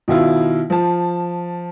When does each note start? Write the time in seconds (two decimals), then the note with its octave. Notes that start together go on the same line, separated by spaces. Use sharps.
0.08 B2 D#3 E4 F4
0.70 F3 A5